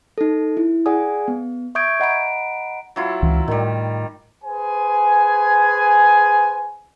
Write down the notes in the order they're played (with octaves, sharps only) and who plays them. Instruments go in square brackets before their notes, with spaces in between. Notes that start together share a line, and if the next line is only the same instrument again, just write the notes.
[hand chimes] D#4 A4
E4
G#4 D5 F#5 G#5 D#6
B3
E5 C#6 D#6 G6 G#6 D7
D#5 F#5 A#5 B5 D7
[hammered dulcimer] F#3 E4 F4
[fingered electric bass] C#2 E3
[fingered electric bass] A2 [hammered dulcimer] D#3 G3
[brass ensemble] G#4 B4 C5 G#5